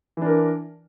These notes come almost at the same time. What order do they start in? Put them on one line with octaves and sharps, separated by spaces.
E3 D4 A#4